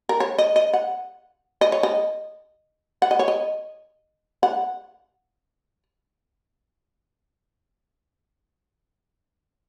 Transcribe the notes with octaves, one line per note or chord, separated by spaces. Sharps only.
A#4
C#5
D#5
D#5
F#5
D#5
C#5
D#5
F#5
D#5
C#5
D#5
F#5